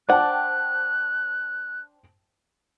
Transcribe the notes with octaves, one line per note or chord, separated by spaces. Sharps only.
D4 C5 F#5 G5 A5 F#6